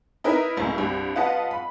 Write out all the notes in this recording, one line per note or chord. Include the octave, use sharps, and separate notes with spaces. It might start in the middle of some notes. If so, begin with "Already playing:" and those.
D#4 E4 A#4 B4
C#2 A2
C2 G2
F4 B4 D#5 F#5 A5
B5